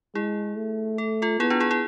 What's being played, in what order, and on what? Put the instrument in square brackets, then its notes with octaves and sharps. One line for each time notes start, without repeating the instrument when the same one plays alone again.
[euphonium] G#3 [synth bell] E4 G#4
[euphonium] A3
[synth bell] A4
F4 A4
[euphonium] B3 [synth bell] E4 G#4
[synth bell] D4 F4
E4 G#4
E4 G#4